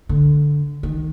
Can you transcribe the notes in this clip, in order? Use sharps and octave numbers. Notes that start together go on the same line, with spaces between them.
D3
D#3